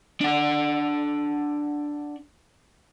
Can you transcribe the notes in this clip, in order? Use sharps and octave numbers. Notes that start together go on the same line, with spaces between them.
D4 F#5